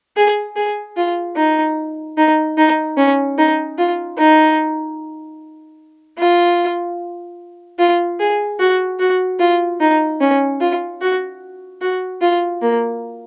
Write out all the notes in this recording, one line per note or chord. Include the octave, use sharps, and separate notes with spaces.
G#4
G#4
F4
D#4
D#4
D#4
C#4
D#4
F4
D#4
F4
F4
G#4
F#4
F#4
F4
D#4
C#4
F4
F#4
F#4
F4
A#3